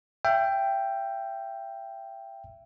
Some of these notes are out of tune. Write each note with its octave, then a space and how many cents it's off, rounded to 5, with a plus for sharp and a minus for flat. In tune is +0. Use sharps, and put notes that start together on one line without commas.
E5 +30 G5 +0